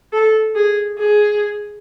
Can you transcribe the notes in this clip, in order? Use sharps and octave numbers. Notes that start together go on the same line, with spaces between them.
A4
G#4
G#4